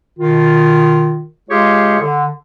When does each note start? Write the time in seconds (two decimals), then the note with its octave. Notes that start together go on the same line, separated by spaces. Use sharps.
0.19 B2 D#3 F4
1.50 G#3 F4 G4 G#4 C#5
2.00 D3